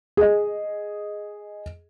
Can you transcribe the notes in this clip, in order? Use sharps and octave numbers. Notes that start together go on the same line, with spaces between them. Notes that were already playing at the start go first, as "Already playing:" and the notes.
G#4 D#5